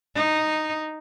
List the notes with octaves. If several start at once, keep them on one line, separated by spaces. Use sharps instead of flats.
D#4